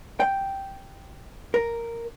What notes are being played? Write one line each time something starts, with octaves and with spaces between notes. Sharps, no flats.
G5
A#4